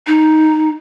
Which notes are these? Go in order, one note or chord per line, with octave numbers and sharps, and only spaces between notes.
D#4